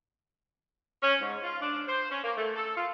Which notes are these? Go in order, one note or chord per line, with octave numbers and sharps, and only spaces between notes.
C#4
G#2
F4
D4
C5
C#4
A#3
A3
A4
F4